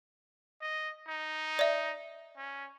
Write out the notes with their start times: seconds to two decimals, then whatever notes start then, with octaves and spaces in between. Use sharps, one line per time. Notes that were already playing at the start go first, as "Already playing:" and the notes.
0.62 D#5
1.08 D#4
1.59 D5 E5
2.37 C#4